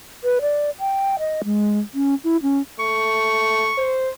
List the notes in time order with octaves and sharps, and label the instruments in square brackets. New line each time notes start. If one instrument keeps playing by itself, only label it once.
[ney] B4
D5
G5
D#5
G#3
C#4
E4
C#4
[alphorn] A3 [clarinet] C#6
[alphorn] C5